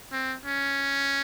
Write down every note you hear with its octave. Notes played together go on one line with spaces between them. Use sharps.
C4
C#4